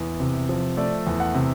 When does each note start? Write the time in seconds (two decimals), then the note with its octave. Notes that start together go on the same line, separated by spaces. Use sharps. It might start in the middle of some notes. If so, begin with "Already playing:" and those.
Already playing: E2
0.20 C3
0.49 F3
0.77 A3 D5
1.07 E2
1.20 F#5
1.35 C3